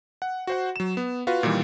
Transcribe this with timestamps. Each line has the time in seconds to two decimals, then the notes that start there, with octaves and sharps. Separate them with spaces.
0.22 F#5
0.47 F#4 C5 F#5
0.76 F#3 E7
0.97 B3
1.27 F4 F#4 B4 F5
1.43 A#2 D#3 E3 G3